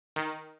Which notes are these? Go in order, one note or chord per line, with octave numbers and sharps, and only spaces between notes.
D#3